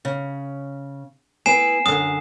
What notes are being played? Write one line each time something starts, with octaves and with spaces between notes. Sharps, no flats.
C#3
B3 E4 B4 G#5 C7 E7
F#2 D3 D#6